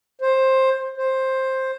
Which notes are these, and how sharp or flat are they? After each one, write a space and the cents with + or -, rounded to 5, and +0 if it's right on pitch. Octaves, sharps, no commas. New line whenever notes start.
C5 +15
C5 +10